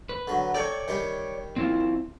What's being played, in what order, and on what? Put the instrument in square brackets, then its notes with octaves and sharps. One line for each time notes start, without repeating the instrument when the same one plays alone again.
[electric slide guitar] B4
[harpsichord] D3 F#3
[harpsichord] A4 G5 A#5 [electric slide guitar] C#5 D5
[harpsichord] D#3 G3 G4
[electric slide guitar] C4 E4 F4